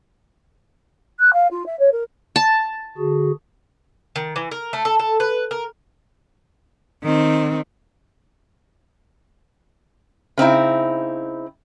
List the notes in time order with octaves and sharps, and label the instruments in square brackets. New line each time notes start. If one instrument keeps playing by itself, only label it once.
[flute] F#6
F5
F4
E5
C#5
A#4
[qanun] A5
[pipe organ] D3 F#4 G#4
[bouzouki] D#3
E3
A#4
A3
A4
A4
B4
A#4
[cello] D#3 C4
[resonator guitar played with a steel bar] C#3 C4 D#4 E4